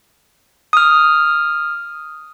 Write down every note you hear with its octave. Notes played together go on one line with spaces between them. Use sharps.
D#6 F6